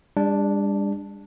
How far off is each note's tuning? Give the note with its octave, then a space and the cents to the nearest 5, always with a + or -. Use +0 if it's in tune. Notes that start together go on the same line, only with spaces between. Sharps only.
G3 +45 D4 +0